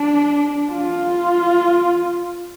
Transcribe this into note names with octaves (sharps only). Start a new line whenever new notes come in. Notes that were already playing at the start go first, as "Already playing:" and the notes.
Already playing: D4
F4